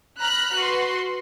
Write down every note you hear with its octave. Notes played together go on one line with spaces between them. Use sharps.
A#5 B5 F6 F#6
F#4 B4 C6